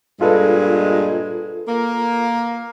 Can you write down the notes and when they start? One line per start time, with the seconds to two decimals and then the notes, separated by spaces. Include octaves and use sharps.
0.21 G2 A#2 G#3 F4 A4 B4
1.67 A#3